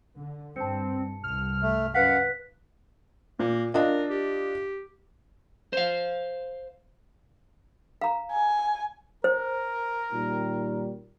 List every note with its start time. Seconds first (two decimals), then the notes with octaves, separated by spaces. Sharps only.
0.17 D3
0.56 G2 C4 A5 C#7
1.24 C2 G2 F6
1.62 A3
1.95 F#2 B4 F5 F#5 F#6 B6
3.39 A#2 A#3
3.74 D4 F4 A#4 D#5
4.10 G4
5.73 C5 F5
8.01 F5 A#5
8.32 G#5
9.24 A#4 C5
10.13 A#2 D#3 G3